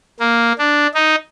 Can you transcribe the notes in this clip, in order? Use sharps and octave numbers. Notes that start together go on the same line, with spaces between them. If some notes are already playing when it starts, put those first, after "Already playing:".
A#3
D4
D#4